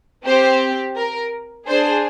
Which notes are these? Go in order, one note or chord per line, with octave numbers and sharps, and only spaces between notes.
C4 G4 C5
A#4
D4 G#4 C5